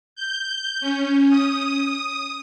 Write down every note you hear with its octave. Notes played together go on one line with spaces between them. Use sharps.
G6
C#4
D#6